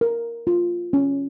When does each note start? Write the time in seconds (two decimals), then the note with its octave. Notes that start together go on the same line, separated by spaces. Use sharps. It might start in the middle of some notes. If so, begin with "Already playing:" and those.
0.01 A#4
0.47 F4
0.93 C#4